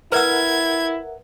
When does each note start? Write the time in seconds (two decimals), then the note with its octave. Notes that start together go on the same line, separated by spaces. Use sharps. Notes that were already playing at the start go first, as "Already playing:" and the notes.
0.12 E4 A#4 B4 E5 F#5 E6 G#6